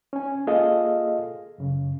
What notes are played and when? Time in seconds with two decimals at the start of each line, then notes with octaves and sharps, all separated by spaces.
0.13 C#4 G#5
0.47 A#3 F4 G#4 A4 D#5 F5
1.58 F#2 C#3